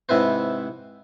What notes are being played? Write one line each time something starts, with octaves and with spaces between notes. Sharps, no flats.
G#2 C3 E4 B4 C5